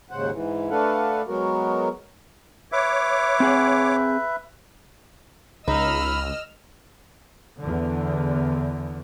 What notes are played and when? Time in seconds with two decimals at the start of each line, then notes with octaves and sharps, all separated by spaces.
0.11 D#2 G#2 C#3 C5 F#5
0.32 G#2 E3
0.70 A3 D4 A4 B4 F5 F#5
1.27 F#3 G#3 B3 F#4 A#4
2.72 B4 C#5 E5 D6
3.40 C4 G#4 F#5
5.68 C#2 D#4 D#5 B5 E6 F6
7.59 E2 D3